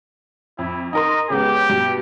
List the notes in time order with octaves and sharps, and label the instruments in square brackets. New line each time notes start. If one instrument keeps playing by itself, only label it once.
[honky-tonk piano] F2 [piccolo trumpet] E4
[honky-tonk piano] D#4 A#4 C6 [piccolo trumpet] D#5
[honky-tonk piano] C#3 G#3 B3 [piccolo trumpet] G4
[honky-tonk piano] G2 B2